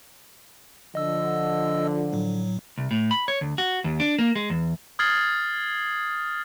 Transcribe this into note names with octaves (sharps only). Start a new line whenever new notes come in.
D3 F3 D#5 E6
A2 F#3
C2
A2
B5
C#5
D2
F#4
D#2
D4
A#3
G#3
E2
D#6 F6 G#6 A6 C7 F#7